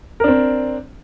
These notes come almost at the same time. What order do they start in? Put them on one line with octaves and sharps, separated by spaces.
A#4 D4 C4